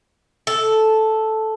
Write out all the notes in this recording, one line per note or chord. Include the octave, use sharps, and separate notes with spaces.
A4